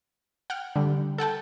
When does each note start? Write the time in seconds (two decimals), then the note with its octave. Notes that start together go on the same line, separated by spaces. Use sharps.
0.50 F#5 G5 F6
0.76 D3 G3
1.18 A4 F#5 G5 A5